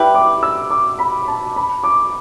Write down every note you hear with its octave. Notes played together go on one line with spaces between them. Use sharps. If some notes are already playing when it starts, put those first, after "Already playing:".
Already playing: G3 E4 G4 B4
D6
E6
D6
B5
A5
B5
D6